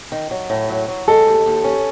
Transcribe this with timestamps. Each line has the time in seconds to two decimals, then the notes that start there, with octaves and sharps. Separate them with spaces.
0.12 D#3
0.31 F#3
0.50 A2
0.69 F#3
0.88 F#3
1.08 G#3 A4
1.27 D#2
1.46 D#2
1.64 C#4